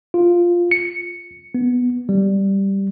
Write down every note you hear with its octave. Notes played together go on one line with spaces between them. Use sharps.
F4
C#7
B3
G3